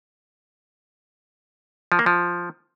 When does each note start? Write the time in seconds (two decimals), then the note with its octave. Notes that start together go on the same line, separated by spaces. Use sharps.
1.92 F3
1.99 A#3
2.06 F3